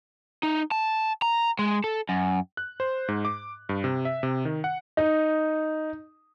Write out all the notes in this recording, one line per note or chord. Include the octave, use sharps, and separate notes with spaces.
D#4
A5
A#5
G#3
A4
F#2
F#6
C5
G#2
D6
G2
C3
E5
C3
D#3
F#5
D#4